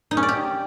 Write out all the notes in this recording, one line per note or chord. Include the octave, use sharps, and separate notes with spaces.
D#4
C#4
D5
G4